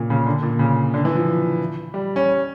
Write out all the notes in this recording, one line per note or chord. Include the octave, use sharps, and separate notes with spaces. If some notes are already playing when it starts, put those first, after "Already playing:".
Already playing: A#2 C#3
C#3
D3
A#2
C#3
D3
E3
F3
G3
C#4